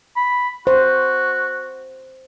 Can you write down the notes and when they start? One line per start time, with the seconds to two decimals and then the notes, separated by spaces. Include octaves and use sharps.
0.16 B5
0.67 F#4 C5